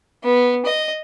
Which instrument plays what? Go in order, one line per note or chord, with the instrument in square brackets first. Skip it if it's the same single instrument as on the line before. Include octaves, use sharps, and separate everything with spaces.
[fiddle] B3
D#5